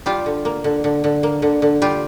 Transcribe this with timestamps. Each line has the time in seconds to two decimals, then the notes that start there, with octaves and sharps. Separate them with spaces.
0.06 G3 F4 G4
0.26 D3
0.45 A#3
0.64 D3
0.84 D3
1.04 D3
1.23 A#3
1.42 D3
1.62 D3
1.82 G3 F4 G4